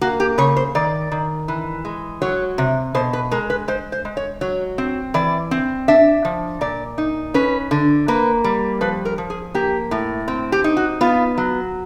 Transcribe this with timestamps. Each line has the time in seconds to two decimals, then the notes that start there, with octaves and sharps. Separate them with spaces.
0.01 A#3 F#4
0.20 G4
0.38 C#3 C#5
0.57 C5
0.75 D#3 D5
1.12 D#3
1.48 E3
1.85 G#3
2.22 F#3 C#5
2.58 C3
2.95 B2 C5
3.13 B4
3.31 G#3 A#4
3.50 B4
3.68 G#3 C5
3.92 C5
4.05 G#3
4.17 C#5
4.41 F#3 C#5
4.78 C4
5.14 E3 D5
5.51 C4
5.88 D4 E5
6.25 F3
6.61 A#2 D5
6.98 D#4
7.34 C#4 B4
7.71 D3
8.08 A#3 B4
8.44 G3
8.81 F3 B4
9.05 A#4
9.18 F3
9.30 G#4
9.54 A#3 G4
9.91 A2
10.28 C4
10.52 G4
10.64 D#4
10.77 F#4
11.01 B3 F4
11.38 F#3